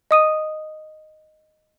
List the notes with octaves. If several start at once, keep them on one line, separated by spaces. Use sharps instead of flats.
D#5 D#6 D#7